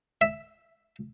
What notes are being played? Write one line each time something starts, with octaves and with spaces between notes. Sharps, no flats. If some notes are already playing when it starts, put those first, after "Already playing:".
E5